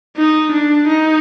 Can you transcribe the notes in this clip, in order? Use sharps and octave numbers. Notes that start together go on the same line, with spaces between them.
D#4
D4
D#4